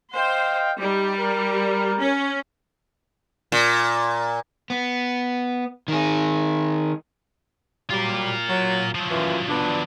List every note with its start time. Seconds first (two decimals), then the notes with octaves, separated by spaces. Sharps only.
0.15 C5 D#5 F5 G5
0.80 G3 D#4 G4
1.17 A#4
1.99 C#4
3.52 A#2
4.70 B3
5.88 D#3 G#4
7.90 F#3 G3 F4 A#4
8.50 F#3
8.95 F3 F#3
9.11 F#2 E3 F4
9.49 B3 D4